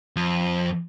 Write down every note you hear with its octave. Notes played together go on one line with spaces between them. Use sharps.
F2